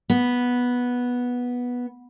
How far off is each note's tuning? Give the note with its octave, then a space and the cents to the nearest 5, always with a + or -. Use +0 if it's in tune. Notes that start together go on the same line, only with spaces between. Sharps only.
B3 -10